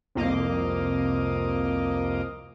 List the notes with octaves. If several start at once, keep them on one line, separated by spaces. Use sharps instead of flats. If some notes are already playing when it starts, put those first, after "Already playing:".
C2 F2 A#3 D#5 F5 D6